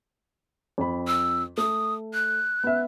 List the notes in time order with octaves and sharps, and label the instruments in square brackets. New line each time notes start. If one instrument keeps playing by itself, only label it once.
[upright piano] F2 B5
[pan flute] E6
[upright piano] A3 [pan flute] D#6
[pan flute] F#6
[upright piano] B3 E5